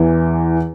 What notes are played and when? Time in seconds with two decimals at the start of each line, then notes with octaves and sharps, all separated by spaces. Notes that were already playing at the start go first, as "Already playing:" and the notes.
Already playing: E2 E3